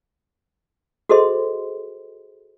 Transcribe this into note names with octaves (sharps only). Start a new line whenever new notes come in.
F#4 G#4 A4 C5 D#5 C6